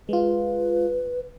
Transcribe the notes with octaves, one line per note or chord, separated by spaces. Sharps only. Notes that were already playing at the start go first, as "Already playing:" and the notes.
G#3 F4 B4